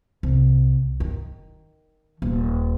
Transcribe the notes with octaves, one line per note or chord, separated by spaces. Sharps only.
C2
D#3
D#1